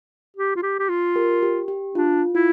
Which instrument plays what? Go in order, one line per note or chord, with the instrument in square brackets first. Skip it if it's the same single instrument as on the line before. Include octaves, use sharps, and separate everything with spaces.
[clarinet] G4
F4
G4
G4
F4
[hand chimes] G4 A#4
G4
G4
[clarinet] D4 [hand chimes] F4
[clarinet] E4 [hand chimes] F4